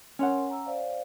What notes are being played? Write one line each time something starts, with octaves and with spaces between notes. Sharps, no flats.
C#4 A#4 C#5 F#5 C6
A#5 E6
C5 D5 F5